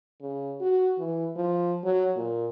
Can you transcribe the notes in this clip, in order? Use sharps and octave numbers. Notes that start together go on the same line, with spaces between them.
C#3
F#4
E3
F3
F#3
A#2